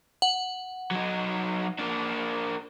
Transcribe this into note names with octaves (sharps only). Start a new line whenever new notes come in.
F#5
F#3 D#4
A#3 D4